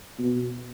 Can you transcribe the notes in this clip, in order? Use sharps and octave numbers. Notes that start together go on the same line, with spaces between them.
B2